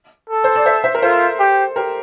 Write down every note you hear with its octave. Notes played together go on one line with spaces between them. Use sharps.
A4
C5
D5
C5 E5
C5 E5
A#4
F4 A4 C5
G4
G4 A#4